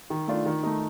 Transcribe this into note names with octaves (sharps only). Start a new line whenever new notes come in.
D#3
A3 D4 F4
D#3
A3 D#4